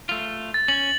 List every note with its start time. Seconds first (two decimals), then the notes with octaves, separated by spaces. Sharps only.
0.09 A3 F4
0.54 A6
0.68 C#4 F#7